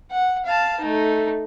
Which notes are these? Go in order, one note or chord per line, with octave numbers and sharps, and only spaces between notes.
F#5
F5 A5
A3 D#4